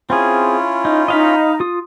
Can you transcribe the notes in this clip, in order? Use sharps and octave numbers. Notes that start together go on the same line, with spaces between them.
C4 C#4 E4 F4 G#4
D#4
D#4 D#5 F5 B5
F4 D#6